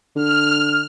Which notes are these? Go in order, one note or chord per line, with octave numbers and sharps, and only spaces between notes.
D3 F6